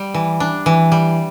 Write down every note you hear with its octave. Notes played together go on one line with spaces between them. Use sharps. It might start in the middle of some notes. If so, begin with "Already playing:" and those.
Already playing: G3
E3
D4
E3
G3